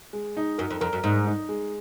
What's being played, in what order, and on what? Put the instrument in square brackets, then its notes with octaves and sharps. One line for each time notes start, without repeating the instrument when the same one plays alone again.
[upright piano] G#3
D#4
[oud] F#2 [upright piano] A#4
[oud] F2
[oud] F2 [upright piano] A#4
[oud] F#2
[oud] G#2 [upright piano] D#4
[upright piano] D#4
G#3